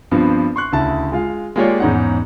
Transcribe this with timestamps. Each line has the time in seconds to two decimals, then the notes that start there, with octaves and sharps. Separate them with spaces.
0.11 G2 F3 B3 C4
0.56 C6 C#6 F#6
0.72 D2 C#3 E4 A5
1.12 G#3 F4 F5
1.56 G#3 A#3 F4 G4 C#5 D5
1.80 E2 G#2 C#4 D#4 F#5